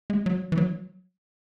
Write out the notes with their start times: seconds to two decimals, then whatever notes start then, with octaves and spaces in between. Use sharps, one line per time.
0.10 G#3
0.26 F#3
0.52 E3
0.57 F#3